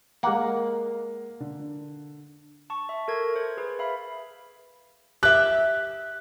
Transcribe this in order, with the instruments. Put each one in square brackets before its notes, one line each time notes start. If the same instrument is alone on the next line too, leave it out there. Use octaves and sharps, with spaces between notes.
[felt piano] G#3 A#4 [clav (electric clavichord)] A#3 F#5
[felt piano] D3
[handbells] A5 C#6
E5
A4 A#4 G#6
C5
G#4 B4
E5 F5 B5
[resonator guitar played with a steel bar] G4 E5 [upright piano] F#6